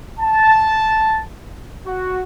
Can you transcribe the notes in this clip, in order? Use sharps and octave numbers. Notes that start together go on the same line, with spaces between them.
A5
F#4